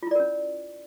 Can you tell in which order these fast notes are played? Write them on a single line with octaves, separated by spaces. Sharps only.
F4 E4 D5 A#4 C#4